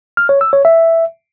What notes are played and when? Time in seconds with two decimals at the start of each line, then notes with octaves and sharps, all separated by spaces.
0.17 F6
0.29 C#5
0.41 E6
0.53 C#5
0.65 E5